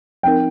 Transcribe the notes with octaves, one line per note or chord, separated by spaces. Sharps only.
F3 C4 D#4 A#4 G5